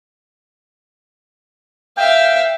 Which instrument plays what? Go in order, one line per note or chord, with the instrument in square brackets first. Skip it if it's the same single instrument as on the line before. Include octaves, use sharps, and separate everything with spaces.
[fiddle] E5 F5 [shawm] G5